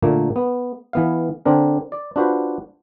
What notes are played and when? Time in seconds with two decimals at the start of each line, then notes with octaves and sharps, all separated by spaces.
0.02 A#2 D3 A3 A#3
0.36 B3
0.93 E3 B3 F5
1.45 D3 C4 D4 A#4
1.92 D5
2.16 D4 F4 F#4 B4 C5